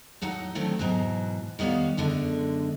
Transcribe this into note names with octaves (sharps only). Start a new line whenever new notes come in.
A2 F#3 D#4 F#5
D3 D#3 F#3 A3 C4
G#2 B2 E3 F#3
D#3 G3 B3 C5 C#5 F5
F#2 B2 D3 G#3 D4